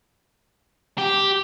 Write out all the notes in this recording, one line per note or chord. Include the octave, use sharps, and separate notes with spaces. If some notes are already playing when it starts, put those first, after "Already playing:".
G4